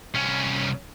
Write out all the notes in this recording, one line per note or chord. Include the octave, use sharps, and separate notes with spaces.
C2 C#4